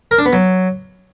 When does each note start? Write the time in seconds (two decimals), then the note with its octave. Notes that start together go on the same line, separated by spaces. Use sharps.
0.11 A#4
0.18 D4
0.26 B3
0.33 F#3